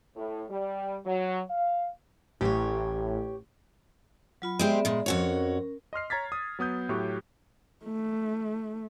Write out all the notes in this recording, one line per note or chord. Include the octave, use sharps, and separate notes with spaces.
A2
G3
F#3
F5
A1 G4 C#5
F#3 F4 B5
G#3 B3 C4 G4 D5 E5
A#2 G#3
F2 C#4 F#4 A#4 C#5
D#5 C6 F6 C7
C#5 A#5 G#6 A6 B6
D#6
F#3 B3 D#6 G6
A2 F#3 G4 C#6 F#6
A3